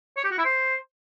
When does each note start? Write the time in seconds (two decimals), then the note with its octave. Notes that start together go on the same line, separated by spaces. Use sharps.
0.17 C#5
0.24 G4
0.31 F#4
0.38 E4
0.45 C5